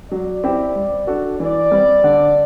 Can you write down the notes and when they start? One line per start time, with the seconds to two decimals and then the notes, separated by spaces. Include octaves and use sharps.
0.11 F#3 D5
0.44 C4 E4 G4
0.76 G3
1.07 D4 F#4 A4
1.40 E3 D5
1.71 G3 C4
2.04 D3